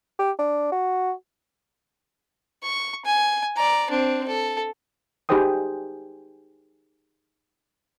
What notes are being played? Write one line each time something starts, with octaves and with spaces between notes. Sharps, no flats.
G4
D4
F#4
C#6
G#5
D5 A#5
C4 D4
A4
D#4 G4 G#4 C5 G5 D#6